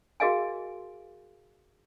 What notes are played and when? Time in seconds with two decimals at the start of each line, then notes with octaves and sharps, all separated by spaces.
0.20 F#4 G#4 A#4 D#5 F5 G#5